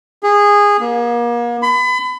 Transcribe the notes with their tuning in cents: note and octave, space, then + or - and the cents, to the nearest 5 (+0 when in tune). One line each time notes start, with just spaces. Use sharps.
G#4 -20
A#3 +35
B5 +30